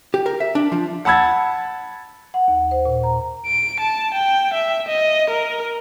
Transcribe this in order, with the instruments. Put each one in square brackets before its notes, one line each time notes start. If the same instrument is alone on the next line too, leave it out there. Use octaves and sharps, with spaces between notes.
[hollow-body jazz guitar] G4
A#4
E5
D4
F3
[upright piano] F#5 A5 B5 E6 G#6 A6
[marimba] F#5
D#2
C5
A#2
A#5
[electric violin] D7
A5
G5
E5
D#5
A#4